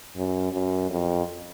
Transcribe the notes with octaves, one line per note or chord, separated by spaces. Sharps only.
F#2
F#2
F2